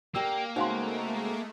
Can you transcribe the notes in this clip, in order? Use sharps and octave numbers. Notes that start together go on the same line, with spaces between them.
D3 A#3 G4 E6
C#3 G#3 A3 C4 D#4 F#4 F5 C6